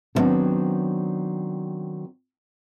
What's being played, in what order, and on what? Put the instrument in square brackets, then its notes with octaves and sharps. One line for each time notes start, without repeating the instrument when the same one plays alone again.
[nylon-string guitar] D3 D#3 F#3 B3 C4 D4